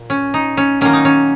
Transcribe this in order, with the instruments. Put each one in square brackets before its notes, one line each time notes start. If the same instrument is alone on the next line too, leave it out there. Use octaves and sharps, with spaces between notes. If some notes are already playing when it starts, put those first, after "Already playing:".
Already playing: [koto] A#2
C#4
D#4
C#4
D#3 F#3 A#3 C#4
D#4
C#4